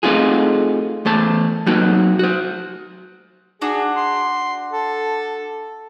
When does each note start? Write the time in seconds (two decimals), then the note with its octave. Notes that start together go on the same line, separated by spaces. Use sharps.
0.03 A3 C4 D#4 F4 F#4 G#4
1.05 E2 A3 C5 A5
1.66 F#3 A#3 C4 D#4 F#4
2.19 F#4 C5
3.62 D4 F#4 G#4
3.96 C6
4.73 A4